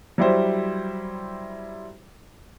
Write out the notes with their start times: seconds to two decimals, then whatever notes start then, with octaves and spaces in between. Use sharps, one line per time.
0.18 F#3 G3 E4 G4 C5